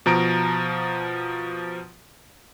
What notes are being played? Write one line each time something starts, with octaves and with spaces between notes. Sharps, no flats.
B2 F3 A#5 D7